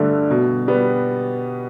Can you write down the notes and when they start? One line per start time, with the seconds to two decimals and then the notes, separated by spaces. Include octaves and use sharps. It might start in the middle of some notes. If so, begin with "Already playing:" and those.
Already playing: G2 D3 A3
0.30 B2
0.68 G3 B3